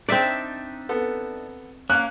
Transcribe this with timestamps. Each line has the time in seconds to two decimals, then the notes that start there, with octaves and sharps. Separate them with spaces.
0.09 C4 D4 D#4 D5 E5
0.89 B3 A4
1.90 A#3 C#4 F5 F#6